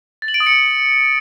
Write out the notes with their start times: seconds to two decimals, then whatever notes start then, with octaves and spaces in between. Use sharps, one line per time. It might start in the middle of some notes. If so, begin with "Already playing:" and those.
0.22 A6
0.28 F#7
0.34 D7
0.40 D#6
0.47 C#7